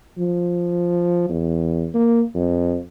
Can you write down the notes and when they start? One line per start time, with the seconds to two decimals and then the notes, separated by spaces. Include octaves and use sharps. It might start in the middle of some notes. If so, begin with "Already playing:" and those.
0.18 F3
1.29 E2
1.94 A#3
2.35 F2